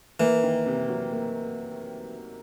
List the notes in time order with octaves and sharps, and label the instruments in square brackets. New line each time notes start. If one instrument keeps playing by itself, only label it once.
[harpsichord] E3 [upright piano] A#3
[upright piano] D#3
C3
F#3
A#3